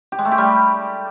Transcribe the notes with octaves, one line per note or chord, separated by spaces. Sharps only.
G4
G#3
A3
G4
G3